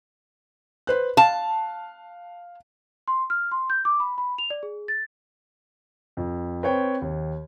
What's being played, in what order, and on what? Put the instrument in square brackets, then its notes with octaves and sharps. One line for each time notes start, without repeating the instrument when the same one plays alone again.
[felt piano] B4 C5 F#6
[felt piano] F5 [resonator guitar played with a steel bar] A5
[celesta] C6
F6
C6
G6
D6
B5
B5
F7
D5
G#4
A6
[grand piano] F2
C4 B4 C#5 G5
D#2